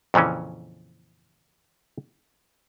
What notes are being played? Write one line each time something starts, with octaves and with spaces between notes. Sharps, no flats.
F2 A#2 C#3 E3 C#4